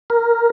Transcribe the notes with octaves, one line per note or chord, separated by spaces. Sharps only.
A#4